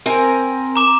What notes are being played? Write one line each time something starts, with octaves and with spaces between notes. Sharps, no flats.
C4 A#4 G#5
A#5 D6 E7